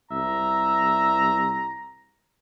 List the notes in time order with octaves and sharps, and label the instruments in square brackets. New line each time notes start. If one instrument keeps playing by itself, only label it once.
[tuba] C2 [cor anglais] E5 [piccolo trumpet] A#5